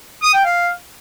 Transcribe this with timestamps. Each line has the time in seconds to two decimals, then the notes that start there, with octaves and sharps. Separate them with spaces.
0.23 D#6
0.34 G5
0.45 F5